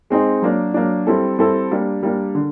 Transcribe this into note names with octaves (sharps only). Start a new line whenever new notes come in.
G#3 C4 D#4
F#3 A#3 D4
F#3 A#3 D4
G3 C4 E4 A4
G3 C4 E4 A4
G3 A#3 D4
G3 A#3 D4
D3